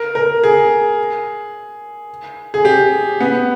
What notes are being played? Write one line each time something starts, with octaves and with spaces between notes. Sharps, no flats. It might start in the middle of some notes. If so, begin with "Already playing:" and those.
Already playing: A#4
A#4
G#4
G#4
G4
B3